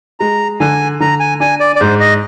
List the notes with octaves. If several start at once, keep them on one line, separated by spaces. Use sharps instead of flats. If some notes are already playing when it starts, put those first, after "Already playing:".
G#3 A#5
D3 G#5
D3 A#5
G#5
D4 G#5
D5
D5
G#2 C5
D#5